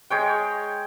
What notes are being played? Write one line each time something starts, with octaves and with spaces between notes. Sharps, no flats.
G#3 C#5 G5